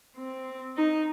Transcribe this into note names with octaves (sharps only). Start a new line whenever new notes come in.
C4
D#4